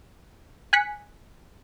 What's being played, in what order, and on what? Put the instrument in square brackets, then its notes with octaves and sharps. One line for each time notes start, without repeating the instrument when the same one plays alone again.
[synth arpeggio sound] G#5 F#6 B6 C#7